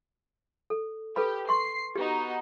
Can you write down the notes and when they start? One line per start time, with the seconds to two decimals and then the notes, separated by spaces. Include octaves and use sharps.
0.70 A4
1.16 G4 A4 B4 B5
1.49 C6 C#6 C7
1.96 B3 D#4 F#4 G4